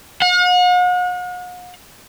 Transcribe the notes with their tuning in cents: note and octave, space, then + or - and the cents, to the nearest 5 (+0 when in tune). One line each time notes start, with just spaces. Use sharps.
F#5 -45